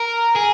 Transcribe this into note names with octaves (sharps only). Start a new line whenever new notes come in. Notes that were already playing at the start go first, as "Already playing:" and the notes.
Already playing: A#4
G#4